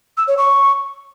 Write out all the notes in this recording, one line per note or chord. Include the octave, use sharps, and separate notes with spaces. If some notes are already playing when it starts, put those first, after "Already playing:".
E6
C#5
C#6